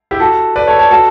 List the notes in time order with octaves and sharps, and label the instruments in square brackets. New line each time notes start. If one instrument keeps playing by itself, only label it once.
[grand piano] E4 G4
F#4 A4
B4 D5
A4 C#5
A4 C#5
F#4 A4